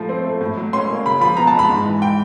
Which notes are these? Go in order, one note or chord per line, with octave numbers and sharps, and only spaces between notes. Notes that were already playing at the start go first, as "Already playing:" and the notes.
Already playing: A2 F3 A3
C4
A3
A2
F#3
C#4 C6
A#3
C#3 B5
F3 B5
B3 A#5
A5
G#3
B5
G#2
E3
G5